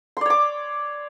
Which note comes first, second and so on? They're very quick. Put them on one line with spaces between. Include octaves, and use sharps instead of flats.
C6 D5 C#5 D6